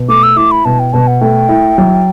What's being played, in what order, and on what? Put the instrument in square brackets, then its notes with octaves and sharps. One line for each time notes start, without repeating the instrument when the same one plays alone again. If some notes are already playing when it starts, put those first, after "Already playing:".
Already playing: [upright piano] B2
[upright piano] A3 [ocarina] D6
[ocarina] E6
[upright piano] E4 [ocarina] D6
[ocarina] B5
[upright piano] B2 [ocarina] A5
[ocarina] G5
[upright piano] B2 [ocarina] A5
[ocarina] F#5
[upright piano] A3 [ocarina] G5
[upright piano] E4
F#3